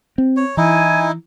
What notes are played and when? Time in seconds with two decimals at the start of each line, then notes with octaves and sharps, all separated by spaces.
0.18 C4
0.36 C#5
0.57 E3 D#4 E4 G#5